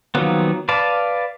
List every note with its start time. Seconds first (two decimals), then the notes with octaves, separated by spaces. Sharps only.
0.15 D#3 F3 F#3 A#3 B3
0.69 B4 D5 F5 A5